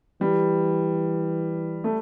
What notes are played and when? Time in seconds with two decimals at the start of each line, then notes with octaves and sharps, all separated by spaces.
0.21 E3 G3
1.84 A3